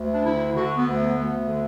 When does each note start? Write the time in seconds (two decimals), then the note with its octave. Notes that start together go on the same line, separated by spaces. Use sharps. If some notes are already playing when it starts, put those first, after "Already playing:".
Already playing: D2
0.13 D4
0.24 D3 E4
0.55 D3 F#4
0.76 B3
0.85 D2
0.96 B3
1.16 D2
1.47 D3